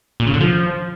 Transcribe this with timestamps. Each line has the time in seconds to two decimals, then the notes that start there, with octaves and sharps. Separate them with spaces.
0.20 A#2
0.27 C#3
0.34 D3
0.41 F3